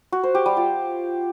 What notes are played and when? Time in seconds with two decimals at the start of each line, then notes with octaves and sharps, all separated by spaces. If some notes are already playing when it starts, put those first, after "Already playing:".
0.12 F#4
0.24 C5
0.35 G4
0.46 G3
0.57 F4